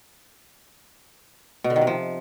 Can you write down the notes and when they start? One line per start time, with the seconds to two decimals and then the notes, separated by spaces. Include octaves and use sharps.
1.64 B2
1.70 D3
1.76 D#3
1.81 C3
1.87 F3